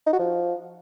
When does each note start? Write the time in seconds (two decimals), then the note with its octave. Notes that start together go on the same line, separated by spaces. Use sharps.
0.06 D#4
0.13 F#4
0.19 F3